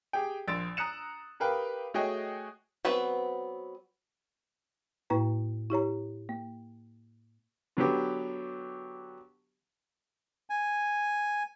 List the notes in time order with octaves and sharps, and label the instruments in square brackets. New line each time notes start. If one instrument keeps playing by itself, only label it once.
[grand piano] G4 G#4 G5
A#1 C6 E6 A6 D7
A#5 D#6 F#6 C#7 E7
G4 A#4 B4 F5 G5
A3 F#4 G#4 C#5 D#5 G5
[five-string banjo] F#3 B3 C4 B4
[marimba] A2 A#3 E4 B4 A#5
E4 G4 C#5 A#5
A#3
[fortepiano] D3 F#3 B3 G4
[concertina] G#5